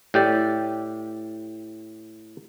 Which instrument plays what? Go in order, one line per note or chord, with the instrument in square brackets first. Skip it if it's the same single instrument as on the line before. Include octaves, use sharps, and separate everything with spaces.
[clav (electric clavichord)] A2 G4 D5